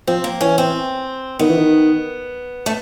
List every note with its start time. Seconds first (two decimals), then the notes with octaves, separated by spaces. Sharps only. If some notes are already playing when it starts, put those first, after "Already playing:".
0.07 F3 C4
0.24 A#3
0.41 E3 C#4
0.58 C4
1.39 D#3 B3
1.49 E3
1.57 D#3
2.66 A3